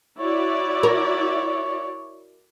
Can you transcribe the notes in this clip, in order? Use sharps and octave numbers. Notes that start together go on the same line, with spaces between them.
E4 F#4 C#5 D5
A#4